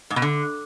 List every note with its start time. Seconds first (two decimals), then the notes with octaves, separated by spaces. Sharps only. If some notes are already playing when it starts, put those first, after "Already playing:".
0.10 G#2
0.16 B2
0.22 D3